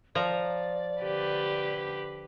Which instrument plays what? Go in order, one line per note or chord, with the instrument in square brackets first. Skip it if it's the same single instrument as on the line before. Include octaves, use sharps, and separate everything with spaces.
[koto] F3 A#5 [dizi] D5
[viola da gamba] D3 G4 B4